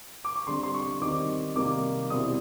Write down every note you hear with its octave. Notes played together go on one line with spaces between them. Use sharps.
D6
C#6
D3 G3 C4 C6
C6
C#6
D#3 G3 C4 D#4 D6
C3 D#3 G3 A#3 D#4 D6
B2 G3 C4 E4 D#6